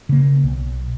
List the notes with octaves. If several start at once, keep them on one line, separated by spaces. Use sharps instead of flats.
C#3 A#3
B1